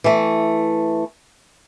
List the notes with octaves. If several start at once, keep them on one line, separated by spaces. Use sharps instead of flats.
E3 A3